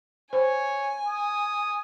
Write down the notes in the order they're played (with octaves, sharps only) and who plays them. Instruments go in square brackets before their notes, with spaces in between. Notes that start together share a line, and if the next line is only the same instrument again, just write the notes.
[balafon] C5 [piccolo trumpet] C#5 [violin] G#5
[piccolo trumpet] D#6